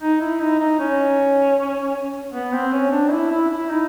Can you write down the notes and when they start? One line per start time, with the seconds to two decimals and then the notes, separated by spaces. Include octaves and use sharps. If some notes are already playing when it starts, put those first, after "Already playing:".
0.01 D#4
0.21 E4
0.40 D#4
0.59 D#4
0.80 C#4
2.34 B3
2.53 C4
2.72 C#4
2.91 D4
3.11 E4
3.31 E4
3.50 E4
3.69 D#4